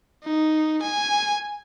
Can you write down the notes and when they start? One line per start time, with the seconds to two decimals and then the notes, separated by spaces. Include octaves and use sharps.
0.24 D#4
0.82 G#5